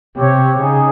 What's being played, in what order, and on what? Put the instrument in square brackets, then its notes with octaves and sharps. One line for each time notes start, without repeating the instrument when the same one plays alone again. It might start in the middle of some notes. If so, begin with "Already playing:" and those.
[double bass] C3 [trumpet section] C4 G4 C#5
[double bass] C#3 [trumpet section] D#4 G#4